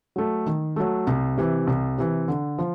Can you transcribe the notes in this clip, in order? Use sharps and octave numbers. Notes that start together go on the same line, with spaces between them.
F#3 A3
D#3
F#3 A3
C2
C3 E3
C2
C3 E3
D3
F3